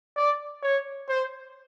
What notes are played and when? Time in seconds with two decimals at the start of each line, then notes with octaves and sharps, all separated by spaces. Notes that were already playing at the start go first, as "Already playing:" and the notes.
0.16 D5
0.63 C#5
1.09 C5